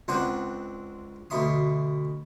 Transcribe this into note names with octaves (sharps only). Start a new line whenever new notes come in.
C#2 C4 D4 C5 F#5 D#6
D2 B2 E5 C6 D#6